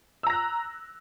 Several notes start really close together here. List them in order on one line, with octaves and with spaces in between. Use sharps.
E6 A#5 A#6 F#6